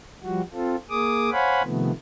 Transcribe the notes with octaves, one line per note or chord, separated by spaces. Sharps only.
F3 G3 F#4
C4 F4 A4
A#3 G#4 D6 D#6
C5 C#5 F5 F#5 G#5 B5
C3 D#3 F3 A3 B3